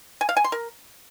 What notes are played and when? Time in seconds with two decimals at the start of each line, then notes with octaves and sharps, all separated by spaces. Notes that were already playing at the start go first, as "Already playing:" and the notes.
0.21 G#5
0.29 F5
0.37 G#5
0.44 C6
0.52 A#4